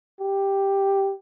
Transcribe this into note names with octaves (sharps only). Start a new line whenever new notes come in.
G4